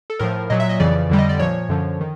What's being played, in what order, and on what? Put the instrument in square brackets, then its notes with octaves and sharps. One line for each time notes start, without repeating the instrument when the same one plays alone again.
[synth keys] A4
A2 F3 A#4
A#2 F#3 D#5
E5
D#5
F2 C#3 E3 D5
F2 D3 G3
D#5
D5
A#2 F3 C#5
F#2 D3 F3
D#3